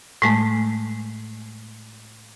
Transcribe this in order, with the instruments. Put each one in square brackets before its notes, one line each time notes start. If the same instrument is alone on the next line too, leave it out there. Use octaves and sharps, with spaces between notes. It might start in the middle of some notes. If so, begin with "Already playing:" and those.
[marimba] A2 G#3 A3